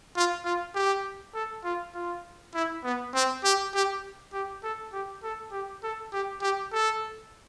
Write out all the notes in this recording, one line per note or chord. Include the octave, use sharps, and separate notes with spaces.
F4
F4
G4
A4
F4
F4
E4
B3
C4
G4
G4
G4
A4
G4
A4
G4
A4
G4
G4
A4